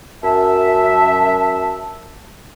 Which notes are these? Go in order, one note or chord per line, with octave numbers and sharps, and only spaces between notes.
F#2 E5 A5